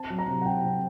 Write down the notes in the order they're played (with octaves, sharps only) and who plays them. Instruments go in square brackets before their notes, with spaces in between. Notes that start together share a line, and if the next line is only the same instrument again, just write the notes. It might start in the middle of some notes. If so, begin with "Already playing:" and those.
Already playing: [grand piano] C4 A5
F#3
A#5
C3
F#5
C3 G5
C4